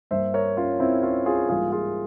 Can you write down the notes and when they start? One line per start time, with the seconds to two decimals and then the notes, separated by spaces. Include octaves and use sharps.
0.11 G2 G3 A#3 C5 E5
0.34 A#4 C#5
0.57 C#4 F4
0.80 C4 E4
1.03 C#4 F4
1.26 F4 G#4
1.49 G#2 E3 G3 A#3 F4 G#4
1.72 F4 G#4